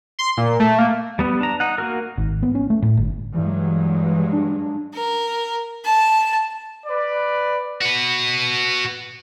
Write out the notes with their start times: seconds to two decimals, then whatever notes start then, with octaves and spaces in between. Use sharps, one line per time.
0.19 C6
0.37 A#2
0.60 A3
0.78 A#3
1.19 G3 B3
1.40 D4 A#5
1.60 D#4 F#5
1.78 A#3 F#4 A#4
2.18 G#1
2.42 B3
2.55 C#4
2.70 A3
2.82 A2
2.97 G1
3.34 G2 E3 F#3 G#3
4.32 D4
4.94 A#4
5.85 A5
6.86 B4 D5
7.81 F#4 B4